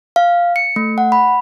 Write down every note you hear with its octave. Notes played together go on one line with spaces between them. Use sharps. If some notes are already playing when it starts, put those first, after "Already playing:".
F5
C#7
A3
F#5
B5